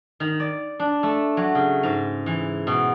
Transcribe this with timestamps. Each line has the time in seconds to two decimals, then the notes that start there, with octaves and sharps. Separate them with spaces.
0.20 D#3
0.40 D5
0.79 D4
1.03 A3
1.37 F#3
1.55 C#3
1.83 G#2
2.26 E3
2.67 B2